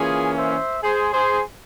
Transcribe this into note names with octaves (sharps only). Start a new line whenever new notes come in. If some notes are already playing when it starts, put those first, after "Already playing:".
Already playing: E3 A#3 C#4 F4 G#4
C5 E5
G#4 C5
G#4 C5